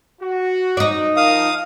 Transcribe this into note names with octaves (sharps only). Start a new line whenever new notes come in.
F#4
D#4 D5
F3 A#4 F5 D#6